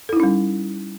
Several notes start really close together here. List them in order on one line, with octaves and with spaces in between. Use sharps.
A4 E4 D#4 C#4 G3